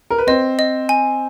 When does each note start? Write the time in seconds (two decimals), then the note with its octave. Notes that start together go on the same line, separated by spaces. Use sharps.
0.10 A#4
0.18 B4
0.27 C4 C5 D#5
0.59 D#5
0.89 G#5